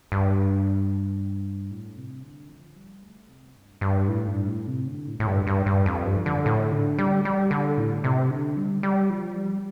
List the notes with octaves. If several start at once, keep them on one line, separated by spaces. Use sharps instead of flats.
G2
A2
C3
D3
F3
G3
A3
C3
G2
G2
A2
G2
A2
C3
D3
A2
A2
G2
G2
G2
F2
G2
F3
D3
A2
D3
G3
G3
D3
A2
C3
D3
G3
G3
F3
G3